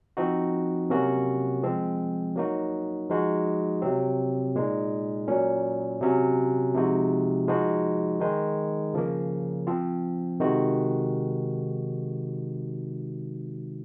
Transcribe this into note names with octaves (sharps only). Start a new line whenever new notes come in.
F3 C4 D#4 F#4
C3 F#3 A#3 C#4 F#4
F3 G#3 C4
F#3 A#3 D#4 F#4
F3 G#3 D#4 F#4
C3 F#3 C4
A#2 G#3 D#4
A#2 F#3 C#4
C3 F#3 C#4
C3 F3 G#3 D#4 F#4
F3 G#3 D#4 F#4
D#3 G#3 D#4
C#3 F3 A#3
F3 C4 F4
C3 D#3 G#3 D#4 F#4